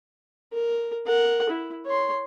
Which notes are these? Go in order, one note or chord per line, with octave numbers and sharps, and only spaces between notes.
A#4
A#4 F#5
E4
C#5 C6